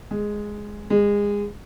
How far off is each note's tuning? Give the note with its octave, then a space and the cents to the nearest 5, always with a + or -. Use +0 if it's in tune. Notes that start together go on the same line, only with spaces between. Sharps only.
G#3 +0
G#3 -25